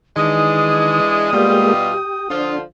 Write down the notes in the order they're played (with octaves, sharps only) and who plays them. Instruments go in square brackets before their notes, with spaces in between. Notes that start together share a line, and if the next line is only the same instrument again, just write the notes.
[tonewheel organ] D#3 [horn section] E3 G#3 D4 [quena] D#6
[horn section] B2 G3 F4 [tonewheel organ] G#3 A#3 G4
[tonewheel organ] G4
[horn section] D3 F3 F4 [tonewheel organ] D4